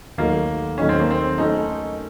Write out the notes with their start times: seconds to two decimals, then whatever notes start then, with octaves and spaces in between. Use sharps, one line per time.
0.18 D#2 D#3 F#3 A3 A#3 D#4
0.78 D#2 D#3 F#3 A3 C#4 D#4
0.89 C4
1.00 A#3
1.11 C4
1.38 F#3 A3 C#4 D#4 A4